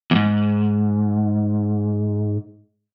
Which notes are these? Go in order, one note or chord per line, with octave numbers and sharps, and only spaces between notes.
E2 G#2